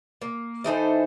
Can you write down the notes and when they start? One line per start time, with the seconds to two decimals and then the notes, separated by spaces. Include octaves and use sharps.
0.22 A#3
0.64 E3 D#4 A4 C5